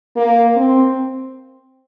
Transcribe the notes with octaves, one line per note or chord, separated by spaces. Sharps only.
A#3
C4